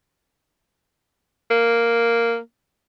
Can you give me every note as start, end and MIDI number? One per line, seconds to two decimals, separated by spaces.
1.51 2.38 58